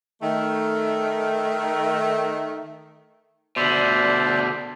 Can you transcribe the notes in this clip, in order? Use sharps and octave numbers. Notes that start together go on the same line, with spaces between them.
D#3 A3
B2 D3 C5 D5 E5